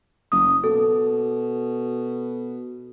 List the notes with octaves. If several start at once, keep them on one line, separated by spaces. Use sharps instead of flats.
F#1 D#6
B2 A4